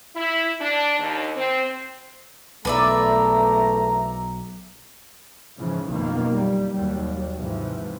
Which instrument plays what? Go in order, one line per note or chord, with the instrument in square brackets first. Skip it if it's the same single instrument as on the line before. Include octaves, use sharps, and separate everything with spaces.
[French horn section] E4
D4
D#2
C4
[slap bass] B1 [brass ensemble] E2 A#3 A#5 [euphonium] A3 [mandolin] B4 D5 E5
[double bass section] G#2 C#3 E3 F3
F#1 F2 B2 D#3 A#3
G3
D#2 F#3 G3
G#2 C3 E3 F3